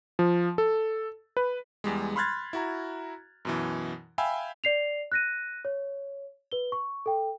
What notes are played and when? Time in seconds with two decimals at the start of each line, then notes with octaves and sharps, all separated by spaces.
0.19 F3
0.58 A4
1.37 B4
1.84 E2 G3 G#3
2.16 B5 C6 F6 F#6 G#6 A6
2.53 E4 F#4 A#5
3.45 F#2 B2 E3
4.18 E5 F5 G5 G#5 B5 E6
4.64 D5 C7 F7
5.12 F#6 A#6 D#7
5.65 C#5
6.52 B4 G7
6.72 C#6
7.06 A4 G5